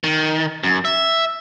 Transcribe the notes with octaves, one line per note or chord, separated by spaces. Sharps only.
D#3
F#2
E5